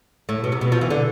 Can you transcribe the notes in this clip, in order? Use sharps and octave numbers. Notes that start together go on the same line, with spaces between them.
A2
B2
C3
B2
F3
E3
D3